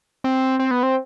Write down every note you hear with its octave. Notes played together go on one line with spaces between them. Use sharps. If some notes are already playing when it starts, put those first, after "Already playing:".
C4
C4
B3
C4